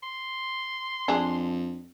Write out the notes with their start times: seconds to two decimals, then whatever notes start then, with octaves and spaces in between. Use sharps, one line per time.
0.03 C6
1.08 F2 D4 G#4